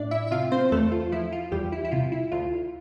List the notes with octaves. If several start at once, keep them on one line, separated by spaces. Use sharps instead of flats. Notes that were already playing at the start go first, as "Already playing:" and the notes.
Already playing: A2 D4 D5
E4 E5
E5
C3 F4 F5
C4 C5
E2 A3 A4
F4
F3 E4
F4
E2 G3 G4
E4
E4
C3 F4
E4
D2 F4